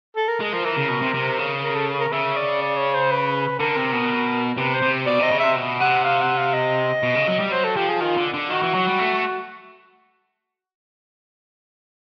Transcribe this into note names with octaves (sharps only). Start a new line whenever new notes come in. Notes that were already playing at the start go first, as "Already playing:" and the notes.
A4
A#4
G#3
F3 A#4
E3 A#4
C#3
B2
C3
C3
C#3
A#4
A4
A#4
C#3 E5
D5
D5
C#5
C5
B4
D3 A#4
C3
B2
C3 B4
C5
C3
B2 D5
C3 D#5
C#3
C3 E5
B2
C3 F#5
F5
F#5
F5
D#5
B2
C#3
F#3
G3
F#3 C5
A4
F3 G4
G#4
D#3 F4
D3
D3
D#3 F#4
E3
F#3
G3
A3